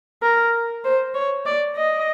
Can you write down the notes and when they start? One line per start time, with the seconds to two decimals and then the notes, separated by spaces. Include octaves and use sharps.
0.23 A#4
0.84 C5
1.15 C#5
1.46 D5
1.76 D#5